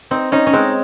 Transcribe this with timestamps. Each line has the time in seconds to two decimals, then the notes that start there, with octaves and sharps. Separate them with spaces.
0.11 C4 D#4
0.32 C#4 D#4
0.47 C#4
0.53 G#3 C4